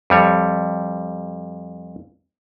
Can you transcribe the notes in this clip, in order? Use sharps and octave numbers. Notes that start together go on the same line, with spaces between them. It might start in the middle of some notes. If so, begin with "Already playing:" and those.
F2 G3 C#5